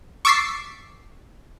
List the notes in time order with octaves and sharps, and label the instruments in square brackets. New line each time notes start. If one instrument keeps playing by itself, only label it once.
[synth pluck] C#6 D6 E6 A6 B6 C7